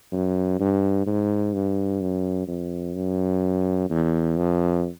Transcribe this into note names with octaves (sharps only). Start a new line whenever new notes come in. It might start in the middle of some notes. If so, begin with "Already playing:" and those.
F#2
G2
G#2
G2
F#2
F2
F#2
E2
F2